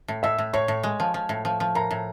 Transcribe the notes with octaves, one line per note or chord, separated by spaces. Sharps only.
A2
A2 E5 E6
A2
A2 C#5 C#6
A2
G#3
F3
F3
A2
F3
F3
A2 A#4 A#5
A2